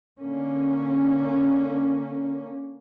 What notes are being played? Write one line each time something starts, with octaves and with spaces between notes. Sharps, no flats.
D3 A#3 C#4